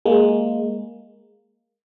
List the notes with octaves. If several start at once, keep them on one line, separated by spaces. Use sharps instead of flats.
G#3 A#3